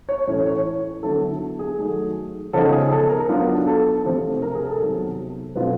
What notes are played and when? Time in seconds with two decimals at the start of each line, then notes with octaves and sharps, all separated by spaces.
0.09 C#5
0.27 A2 E3 A3 C#4 C#5
0.46 C#5
1.03 D3 F#3 B3 E4 A4
1.59 G#4
1.78 D#3 F#3 A3
2.53 C#3 F3 G#3 B3 D#4 A4
2.72 G#4
2.91 A4
3.10 A#4
3.29 F#3 B3 D4 F4
3.67 A4
4.05 C3 F3 A3 C4 F4
4.42 A#4
4.55 G#4
4.67 A4
4.80 C3 D#3 F#3 B3
5.55 B2 F#3 A3 C4 F4 B4